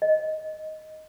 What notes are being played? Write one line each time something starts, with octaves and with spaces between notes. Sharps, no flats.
D#5